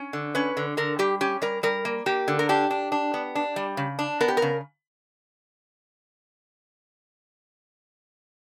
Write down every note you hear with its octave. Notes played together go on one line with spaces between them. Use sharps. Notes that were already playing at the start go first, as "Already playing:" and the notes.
Already playing: C#4
D3
C#4 B4
D3
D3 A#4
G3 G4
C#4 G4
G3 A#4
G3 A#4
A#3
A#3 G4
D3
A#4
D4 G4
D4
D4
B3
D4
G3
C#3
D4
B3 A#4
G4
A#4
C#3